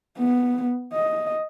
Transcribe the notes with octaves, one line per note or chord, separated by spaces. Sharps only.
B3
D#5